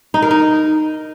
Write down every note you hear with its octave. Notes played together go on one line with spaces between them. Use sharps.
D#4
A#4
D#4